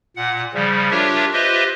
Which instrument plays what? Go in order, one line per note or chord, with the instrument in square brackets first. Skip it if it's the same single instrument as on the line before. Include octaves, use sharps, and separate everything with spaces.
[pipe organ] A#2 F#5
C#3 F3 G3
D4 F4 G4 A#4 C#5 E5
F4 G4 B4 C5 D#5 E5